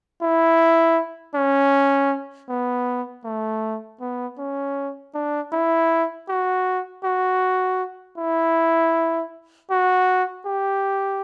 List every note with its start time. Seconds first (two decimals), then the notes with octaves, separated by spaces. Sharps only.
0.22 E4
1.35 C#4
2.49 B3
3.24 A3
4.00 B3
4.38 C#4
5.14 D4
5.52 E4
6.29 F#4
7.04 F#4
8.18 E4
9.71 F#4
10.46 G4